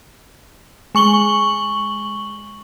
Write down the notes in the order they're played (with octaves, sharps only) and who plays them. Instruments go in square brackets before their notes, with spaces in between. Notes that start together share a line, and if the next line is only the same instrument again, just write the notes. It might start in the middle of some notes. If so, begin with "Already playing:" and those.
[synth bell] G#3 C#6 F#7 G7